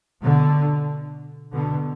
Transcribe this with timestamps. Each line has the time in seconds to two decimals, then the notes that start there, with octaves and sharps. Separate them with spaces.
0.21 B2 D3
1.53 B2 D3